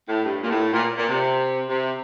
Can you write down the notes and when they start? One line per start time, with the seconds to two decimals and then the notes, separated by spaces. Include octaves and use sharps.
0.08 A2
0.25 G2
0.43 A#2
0.49 A2
0.73 A#2
0.97 A#2
1.09 C3
1.69 C3